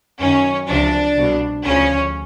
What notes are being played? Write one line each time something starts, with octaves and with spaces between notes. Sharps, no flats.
F#2 D#3 C#4
C#2 C3 F3 D4
C2 B2
D2 C#3 F3 C#4